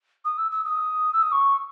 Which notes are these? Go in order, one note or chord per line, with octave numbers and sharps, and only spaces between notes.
D#6
E6
E6
D#6
E6
D#6
C#6